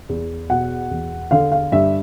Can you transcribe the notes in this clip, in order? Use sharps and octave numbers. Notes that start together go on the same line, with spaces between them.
E2
B2 F#5
E2
D3 F5
F5
G2 E5